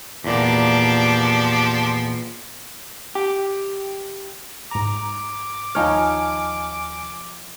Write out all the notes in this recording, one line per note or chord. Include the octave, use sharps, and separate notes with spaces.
E2 A#2 F3 D4 G4
G4
G#2 A#5 D6
D#2 F3 D#4 C#5 G#5 F6